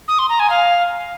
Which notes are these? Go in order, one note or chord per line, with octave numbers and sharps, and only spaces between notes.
D#6
C6
A#5
G#5
F5